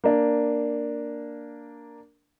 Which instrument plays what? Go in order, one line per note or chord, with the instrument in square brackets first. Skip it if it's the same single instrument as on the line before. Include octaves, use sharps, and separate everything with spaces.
[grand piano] A#3 D4